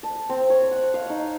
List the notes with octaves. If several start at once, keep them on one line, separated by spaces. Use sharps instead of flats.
A5
C4
C#5
F#5
F5
D#4